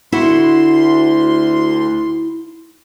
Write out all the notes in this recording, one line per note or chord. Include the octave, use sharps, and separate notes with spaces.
D2 E4 F#4 F#5 C6